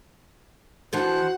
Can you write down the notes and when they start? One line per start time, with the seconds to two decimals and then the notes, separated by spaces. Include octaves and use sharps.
0.93 E3 D4 F#4 A4 C5 F#5